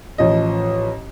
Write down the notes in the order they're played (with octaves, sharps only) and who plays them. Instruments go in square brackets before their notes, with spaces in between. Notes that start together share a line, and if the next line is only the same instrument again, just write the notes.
[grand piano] A1 F3 D#5